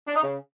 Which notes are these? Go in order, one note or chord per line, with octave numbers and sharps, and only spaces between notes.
D4
D#4
C#3